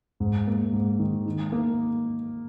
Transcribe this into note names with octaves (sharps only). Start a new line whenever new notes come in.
G#2
A#3
G#2
D#3
D#4
A#3